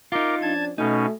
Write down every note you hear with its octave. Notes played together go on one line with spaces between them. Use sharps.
D#4 F4 A#4 D6
F3 C#4 D4 A5 G#6
B2 A3 C#4 D#4